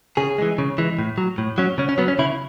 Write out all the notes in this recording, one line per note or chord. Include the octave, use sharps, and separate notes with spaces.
C#3 G#4
E3 G#3
C#3
E3 G#3
A2
F#3
A2
F#3 C#4
C#3 C#4
C#4
F#3 B3
C#4
C#3 E4